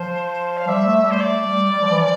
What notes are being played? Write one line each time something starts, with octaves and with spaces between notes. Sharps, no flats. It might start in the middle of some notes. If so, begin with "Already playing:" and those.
Already playing: F3 C5
F5
G3 E5
A3
G3
C5
A3 D5
G3
G3
F3
E3
F3